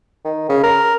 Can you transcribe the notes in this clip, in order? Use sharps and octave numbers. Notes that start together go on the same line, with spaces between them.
D#3
C#3
A#4